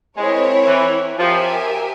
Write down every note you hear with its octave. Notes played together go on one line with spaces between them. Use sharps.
G#3 C4 E4 A#4 C#5
E3
F3 G4 A#4 E5 G#5